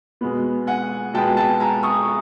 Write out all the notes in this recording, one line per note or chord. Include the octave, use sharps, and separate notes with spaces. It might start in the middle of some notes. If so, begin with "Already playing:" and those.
B2 G#3 B3
F#5 G#5
B2 G#3 B3 G5 A5
G5 A5
G#5 A#5
C#6 D#6